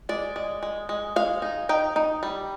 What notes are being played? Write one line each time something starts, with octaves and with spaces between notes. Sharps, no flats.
G#3 D5
G#3
G#3
G#3
G#3 F5
D#4
D#4 G5
D#4
G3